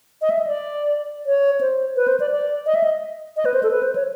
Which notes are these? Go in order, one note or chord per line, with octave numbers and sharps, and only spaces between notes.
D#5
E5
D#5
D5
C#5
C5
B4
C5
D5
D5
D#5
E5
D#5
D#5
B4
C5
A4
B4
C5
C#5